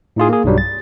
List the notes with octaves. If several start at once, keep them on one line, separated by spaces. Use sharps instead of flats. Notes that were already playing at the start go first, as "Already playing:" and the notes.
A2 D#4 F4 G#4
A#3 G#4
B1 G2 F#3 G3
A6